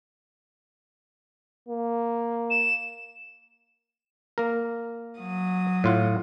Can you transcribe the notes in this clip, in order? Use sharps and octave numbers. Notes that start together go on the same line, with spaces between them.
A#3
E7
A#3 A#4
F#3 D#6
A2 F4 F#5